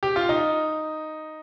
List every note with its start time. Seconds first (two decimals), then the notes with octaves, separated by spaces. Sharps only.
0.03 G4
0.16 F4
0.29 D#4